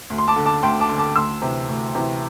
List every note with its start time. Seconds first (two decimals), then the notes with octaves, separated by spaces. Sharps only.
0.10 D2
0.18 C6
0.28 A5 D6
0.36 D3
0.45 A5 D6
0.63 D2 G5 C6
0.80 A5 D6
0.89 D3
0.98 A5 D6
1.16 D2 C6 E6
1.42 C3 E3
1.69 D2
1.95 C3 E3